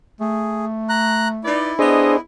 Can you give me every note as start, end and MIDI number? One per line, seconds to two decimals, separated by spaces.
0.21 1.53 57
0.21 0.65 68
0.89 1.28 82
0.89 1.28 90
1.44 1.72 63
1.44 2.20 64
1.44 1.72 71
1.44 1.72 74
1.79 2.14 59
1.79 2.17 62
1.79 2.17 68
1.79 2.14 69
1.79 2.17 72
1.79 2.14 75